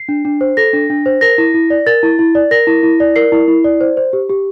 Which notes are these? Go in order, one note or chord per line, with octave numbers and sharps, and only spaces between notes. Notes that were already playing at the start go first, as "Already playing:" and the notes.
Already playing: C7
D4
D4
C5
A4 A#6
D4
D4
C5
A#4 A#6
E4
E4
D5
A#4 A6
E4
E4
D5
A#4 A#6
E4
E4
D5
A#4 C7
E4
E4
D5
C5
C5
G4
G4